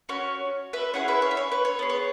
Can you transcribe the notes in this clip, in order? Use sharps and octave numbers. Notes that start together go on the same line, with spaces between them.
C#4 F#4 C#5
B4 E5
C#4 E4 G#4 C#5 F#5
B4 E5
C#5
E5
C#5
B4
C#5
B3 G#4
C#5